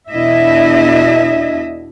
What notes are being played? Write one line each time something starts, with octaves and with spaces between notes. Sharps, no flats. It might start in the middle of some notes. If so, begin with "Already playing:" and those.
E2 B2 D4 E4 D#5 E5